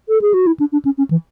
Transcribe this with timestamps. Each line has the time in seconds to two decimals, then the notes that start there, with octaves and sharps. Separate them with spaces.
0.09 A4
0.21 G#4
0.34 F#4
0.46 E4
0.59 D4
0.72 D4
0.85 C#4
0.98 C#4
1.10 E3